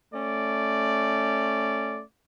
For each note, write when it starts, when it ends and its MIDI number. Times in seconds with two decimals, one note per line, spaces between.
0.13 2.01 57
0.13 2.01 61
0.13 2.01 74